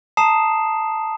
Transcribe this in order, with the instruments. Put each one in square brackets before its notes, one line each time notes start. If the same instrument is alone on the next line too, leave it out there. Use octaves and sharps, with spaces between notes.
[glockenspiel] A5 A#5 D#6 C7 E7